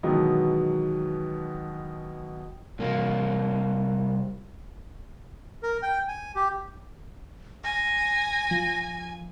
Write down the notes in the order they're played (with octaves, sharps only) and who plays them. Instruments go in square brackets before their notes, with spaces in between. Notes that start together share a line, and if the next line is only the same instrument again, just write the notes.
[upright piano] B2 D#3 E3 F#3 G#3 B3
[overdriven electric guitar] C2 A#3
[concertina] A#4
G5
G#5
G4
[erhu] G#5 [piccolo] A#6
[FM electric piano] F3